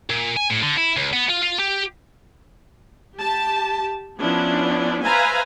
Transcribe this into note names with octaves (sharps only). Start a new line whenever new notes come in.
A#2
G#5
A2
D3
E4
C#2
B3
F4
F4
G4
G4 A5
F3 B3 C#4 D4 E4
B4 C5 E5 F5 G#5 A#5